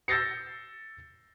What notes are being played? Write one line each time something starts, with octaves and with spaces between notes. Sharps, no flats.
E6 G6 A6 A#6 C7 C#7